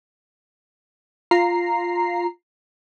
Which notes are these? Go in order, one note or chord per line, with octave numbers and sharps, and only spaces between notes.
F4 A#5 C7